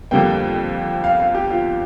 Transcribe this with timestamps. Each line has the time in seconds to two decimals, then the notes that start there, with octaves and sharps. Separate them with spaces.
0.11 F2 D3 G3 A#3 G5
1.04 F5
1.20 F5
1.35 G4
1.50 F4